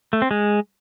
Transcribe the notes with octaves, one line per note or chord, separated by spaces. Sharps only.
A3
C4
G#3